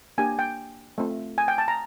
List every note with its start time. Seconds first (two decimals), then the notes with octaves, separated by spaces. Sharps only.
0.18 A#3 D4 G4 G#5
0.39 G5
0.98 A3 C4 F4
1.38 G#5
1.48 G5
1.58 A5
1.68 A#5